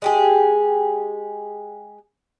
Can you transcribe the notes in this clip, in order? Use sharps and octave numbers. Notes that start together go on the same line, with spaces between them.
G#3 G4 G#4